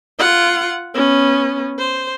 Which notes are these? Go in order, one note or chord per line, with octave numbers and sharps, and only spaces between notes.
F4 F#5
B3 C#4
C5